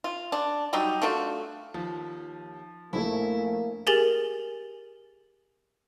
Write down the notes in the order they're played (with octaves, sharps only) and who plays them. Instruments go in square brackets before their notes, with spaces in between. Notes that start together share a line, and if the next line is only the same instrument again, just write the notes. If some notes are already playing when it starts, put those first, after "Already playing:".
[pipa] F4
D4
F#3 G3 D#4 G4
A3 D4 F4 F#4
[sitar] D#2 [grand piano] F3
[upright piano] A#1 A3 [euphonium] A#3 [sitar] E4
[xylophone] G4 G#4 A#4 G#5 A6 F#7